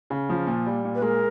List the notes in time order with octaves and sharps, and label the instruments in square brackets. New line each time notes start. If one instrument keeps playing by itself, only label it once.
[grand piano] C#3
F3
A#2
G3
A#2
[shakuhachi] B4
[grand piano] G#3 [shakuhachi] A#4